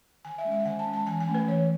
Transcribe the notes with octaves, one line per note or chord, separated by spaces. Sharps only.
D#3 G#5
E5
G#3 C#4
E5
F#5
D#3 G#5
A5
G#3 C#4
A5
E3 G#5
G#5
A3 C#4
B4
E3 C#5